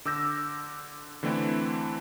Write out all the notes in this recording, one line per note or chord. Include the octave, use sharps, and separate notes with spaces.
D3 D6 E6 G6 A#6
D3 E3 A3 C4 D4 E4